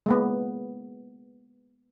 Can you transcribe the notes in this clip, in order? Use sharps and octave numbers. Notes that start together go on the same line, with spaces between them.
G#3 A#3 B3